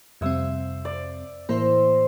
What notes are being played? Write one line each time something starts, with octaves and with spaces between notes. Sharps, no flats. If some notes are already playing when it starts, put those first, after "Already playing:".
F2 C3 G3 C4 E5
D5
A2 E3 A#3 E4 C5